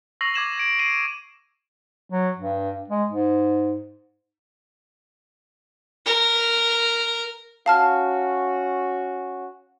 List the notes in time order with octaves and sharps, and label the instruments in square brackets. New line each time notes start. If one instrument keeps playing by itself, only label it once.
[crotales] C#6 E6 A#6 C7 F7 F#7
D6 G#6 E7 F#7
G#6 D7
C7 D7 D#7 F#7
[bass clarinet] F#3
G2
G#3
G#2
[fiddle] A#4
[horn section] C#4 F#4 [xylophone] F5 A5 F6